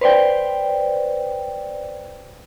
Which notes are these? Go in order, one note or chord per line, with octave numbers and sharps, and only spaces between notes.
B4 C5 D5 G5